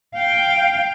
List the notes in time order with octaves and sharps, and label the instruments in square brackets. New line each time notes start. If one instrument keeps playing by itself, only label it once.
[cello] F5 G5